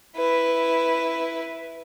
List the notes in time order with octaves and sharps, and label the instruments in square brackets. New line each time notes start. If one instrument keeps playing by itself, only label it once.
[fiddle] E4 B4